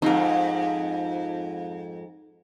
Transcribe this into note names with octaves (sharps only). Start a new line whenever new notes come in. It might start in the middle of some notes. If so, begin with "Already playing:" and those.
F2 G#2 D#4 A#4